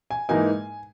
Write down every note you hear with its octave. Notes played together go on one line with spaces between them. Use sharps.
G#5
G#2 E3 A#3 D#4 G#5